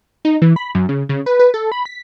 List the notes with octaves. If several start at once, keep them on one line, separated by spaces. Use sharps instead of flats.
D#4
E3
B5
F#2
C#3
C#3
B4
B4
A4
B5
B6